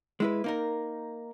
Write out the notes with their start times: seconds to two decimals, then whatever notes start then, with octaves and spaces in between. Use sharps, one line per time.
0.20 G#3 E4 B4
0.44 A#3 D#4 A#4